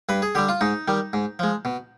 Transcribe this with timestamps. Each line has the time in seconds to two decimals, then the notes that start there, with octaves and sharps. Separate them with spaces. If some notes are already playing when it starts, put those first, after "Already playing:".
0.09 G2 B4
0.22 G#4
0.35 D3 G3 G4
0.49 F4
0.61 G#2 D#4
0.88 D#3 G3
1.13 G#2
1.39 F3 G#3
1.65 B2